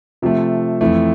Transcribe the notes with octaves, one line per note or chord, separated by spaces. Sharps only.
C3 F3 A3
F2 E3 A3